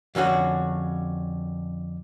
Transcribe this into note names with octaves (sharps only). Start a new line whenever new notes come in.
F2 D3 C#4 F#4